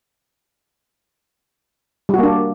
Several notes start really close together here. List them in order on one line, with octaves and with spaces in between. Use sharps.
G3 F#4 A#3 D4